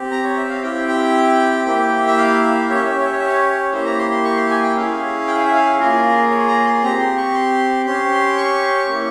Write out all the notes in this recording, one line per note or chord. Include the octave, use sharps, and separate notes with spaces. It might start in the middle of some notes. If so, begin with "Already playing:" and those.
Already playing: C4 G4
A#5
C#5
E5
F5
C4 E4 G4 G5
G5
A#3 E4 G4
E5
F5
E5
C#4 G4 C#5 E5
C#5
E5
C#5
E5
C#5
E5
C#5
A#3 E4 G4 C5
A#5
C6
C6
C#6
C6
G#5
G5
C#4 E4 G#4 F5
G5
F5
E5
F5
A#3 F4 G#4 A#4
C#5
A#5
C6
C4 G4 A#5
C6
C#6
C6
C#4 G4 C6
C#6
A#3 C#4 E4